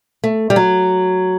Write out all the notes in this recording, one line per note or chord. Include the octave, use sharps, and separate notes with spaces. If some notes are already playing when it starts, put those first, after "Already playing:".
A3
G3
F#3